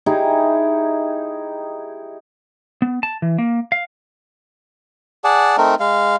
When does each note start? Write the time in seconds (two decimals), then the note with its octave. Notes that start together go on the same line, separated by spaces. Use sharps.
0.06 D#4 E4 G4 G#4
2.82 B3
3.03 A5
3.22 E3
3.38 A#3
3.72 F5
5.24 G#4 D5 F#5 A5
5.58 A3 C4 D#4 A#4
5.80 G#3 F5